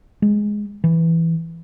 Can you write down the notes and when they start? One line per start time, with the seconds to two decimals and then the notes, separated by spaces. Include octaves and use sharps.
0.22 G#3
0.84 E3